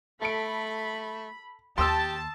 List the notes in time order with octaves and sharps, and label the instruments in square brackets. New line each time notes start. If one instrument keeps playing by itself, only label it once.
[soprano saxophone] A3 [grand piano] A4 C#7 D7 [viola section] B5
[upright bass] D#2 [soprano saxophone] G4 [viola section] A5 [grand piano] C6 D#6 E6